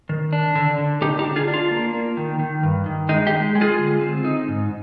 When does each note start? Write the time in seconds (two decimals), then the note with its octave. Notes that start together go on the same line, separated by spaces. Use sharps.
0.09 D#3
0.33 D4
0.56 D3
0.78 D3
1.01 D3 D#4 G4
1.19 D#4 G4
1.25 D4
1.36 F4 G#4
1.48 D4
1.54 F4
1.71 A#3
1.94 A#3
2.17 D#3
2.40 D#3
2.63 G2
2.86 D#3
3.09 G#3 D#4
3.27 D#4 G4
3.32 G#3
3.55 G#3
3.61 F4 G#4
3.79 D3
4.01 C4
4.25 D#4
4.48 G#2